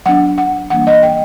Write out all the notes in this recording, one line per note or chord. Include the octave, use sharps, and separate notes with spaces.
F#3 B3 D4 F#5
F#5
E3 G3 A#3 D4 F#5
D#5
G5